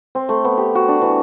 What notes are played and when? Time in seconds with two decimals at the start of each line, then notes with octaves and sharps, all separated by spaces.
0.15 C4
0.29 A3
0.45 B3
0.58 G4
0.75 F#4
0.88 D4
1.02 E3